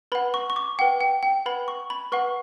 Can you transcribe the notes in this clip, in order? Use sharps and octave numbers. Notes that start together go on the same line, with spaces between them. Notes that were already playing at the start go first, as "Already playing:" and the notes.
B4 F#5 B5
C#6
C#6
D6
B4 F#5 G5
G5
G5
B4 F#5 B5
C#6
B5
B4 F#5 C#6